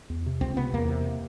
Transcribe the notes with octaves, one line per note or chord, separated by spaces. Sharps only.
E2
C3
C#2 C4
C3 B3
E2 A#3
C3